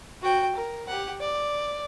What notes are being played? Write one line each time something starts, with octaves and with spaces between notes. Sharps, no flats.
F#4 G5
A#4
G4 F#5
D5